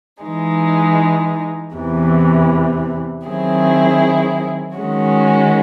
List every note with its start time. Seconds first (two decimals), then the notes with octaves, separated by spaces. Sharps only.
0.23 E3 G#3 D#4
1.75 E2 C3 E3
3.26 D#3 F#3 C4 E4 G#4
4.77 D#3 G#3 C#4 F#4